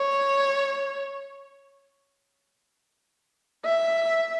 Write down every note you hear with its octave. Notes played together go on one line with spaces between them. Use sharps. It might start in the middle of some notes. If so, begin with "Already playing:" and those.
Already playing: C#5
E5